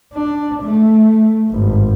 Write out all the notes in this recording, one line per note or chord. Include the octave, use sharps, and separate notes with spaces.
D4
A3
G#1 G2